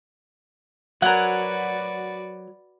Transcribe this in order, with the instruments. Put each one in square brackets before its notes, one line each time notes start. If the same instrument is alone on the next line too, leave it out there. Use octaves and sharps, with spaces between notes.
[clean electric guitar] F#3 A#4 [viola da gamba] F#4 B4 D5 [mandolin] F#5 G#5